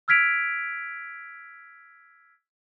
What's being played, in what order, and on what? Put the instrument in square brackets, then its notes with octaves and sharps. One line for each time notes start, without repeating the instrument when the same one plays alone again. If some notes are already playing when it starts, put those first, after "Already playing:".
[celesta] E6 F6 G#6 B6 D7 F7